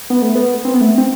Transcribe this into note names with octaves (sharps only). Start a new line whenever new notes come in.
B3
A3
B3
C4
B3
A3
C4